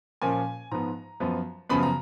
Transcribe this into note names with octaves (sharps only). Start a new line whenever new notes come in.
A#2 F3 A#3 C#4 G#5
G#2 F3 B3 A#5
F#2 F3 B3
F#2 C#3 F3 B3 B5
A#5